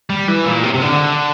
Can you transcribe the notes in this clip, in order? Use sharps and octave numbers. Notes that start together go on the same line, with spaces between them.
G3
E3
A#2
C3
C3
D3